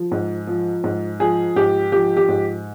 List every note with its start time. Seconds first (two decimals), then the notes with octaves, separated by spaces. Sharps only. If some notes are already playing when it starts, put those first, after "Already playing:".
Already playing: F3
0.11 G#2
0.47 F3
0.84 G#2
1.20 F3 G#4
1.56 G#2 G4
1.92 F3 G4
2.17 G4
2.28 G#2